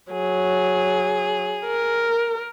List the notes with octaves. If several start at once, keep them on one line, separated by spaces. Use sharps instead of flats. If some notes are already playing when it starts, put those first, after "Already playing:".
F#3 G#4
A#4